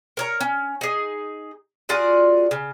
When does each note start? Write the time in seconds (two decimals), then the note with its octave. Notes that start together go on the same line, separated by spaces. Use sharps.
0.17 A#4 C#5 A#5
0.41 C#4
0.81 D#4 G#4
1.89 F4 F#4 G#4 D5
2.51 C#3